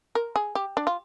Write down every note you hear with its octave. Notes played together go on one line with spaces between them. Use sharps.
A#4
G#4
G4
D4
F4